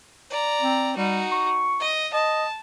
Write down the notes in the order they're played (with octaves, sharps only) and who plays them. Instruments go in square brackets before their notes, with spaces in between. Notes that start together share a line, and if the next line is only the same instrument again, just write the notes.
[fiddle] D5 A#5
[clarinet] C4
[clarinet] G3 [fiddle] D#4 F#4
[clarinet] C#6
[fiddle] D#5
[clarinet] D#5 [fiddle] A5